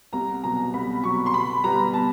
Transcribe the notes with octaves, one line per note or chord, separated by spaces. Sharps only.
C2 A#5
B2 F#3 A#5
C2 B5
B2 F#3 C#6
C6
B2 B5
G3 B3 A#5
B2 A5